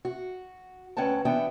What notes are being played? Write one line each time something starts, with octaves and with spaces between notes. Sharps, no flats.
F#4
D2 C#4 B4 F#5 G5 A5
E3 B3 D4 F#4 E5 G5